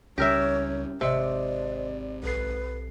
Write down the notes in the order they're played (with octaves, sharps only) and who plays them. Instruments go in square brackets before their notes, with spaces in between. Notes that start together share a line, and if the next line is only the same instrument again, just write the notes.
[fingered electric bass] C#2 G3 [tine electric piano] C#4 [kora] G4 A#4 E5 [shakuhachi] C#5
[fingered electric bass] G#1 [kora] C3 [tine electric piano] C5 D#5 [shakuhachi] D5
[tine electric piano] B1 A4 C7 [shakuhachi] B4